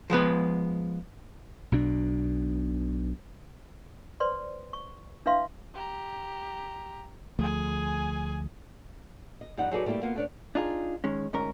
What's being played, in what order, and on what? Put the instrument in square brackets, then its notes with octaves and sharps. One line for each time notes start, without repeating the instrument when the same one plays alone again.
[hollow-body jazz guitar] F3 G#3 B3 B4
[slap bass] B1 B2 D4
[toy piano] B4 C5 D5 C6
C#6
D4 E4 B4 E5 F5 C6
[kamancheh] G4 A#5
[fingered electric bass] D2 F3 A3 [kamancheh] G#4 G#5
[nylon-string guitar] D#5
F2 G3 D#4 F#5
F#3 D#4 G#4 A4 B4 D5
G3 A3 A#3 E4 G4
A#3 B3 F4 F#4
A3 D4 C#5
[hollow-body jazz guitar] D4 D#4 F4 G#4
D#3 G#3 C#4
D2 G#2 C#4 A#4